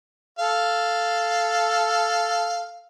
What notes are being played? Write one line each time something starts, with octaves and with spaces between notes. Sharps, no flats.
A4 F5